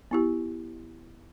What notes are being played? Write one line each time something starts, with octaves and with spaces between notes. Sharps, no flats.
B3 E4 G4